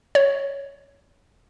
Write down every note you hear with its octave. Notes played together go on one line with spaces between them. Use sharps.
C#5